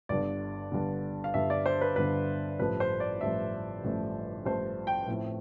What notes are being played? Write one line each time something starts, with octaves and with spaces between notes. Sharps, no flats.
G1 G2 D3 D5
G1 G2 D3
F5
G1 G2 D3 E5
D5
C5
B4
G1 G2 D3 B4
A1 G2 F3 A3 B4
C5
D5
A1 G2 F3 A3 E5
A1 G2 F3 A3
A1 G2 F3 A3 C5
G5
A2 F3 C4 E4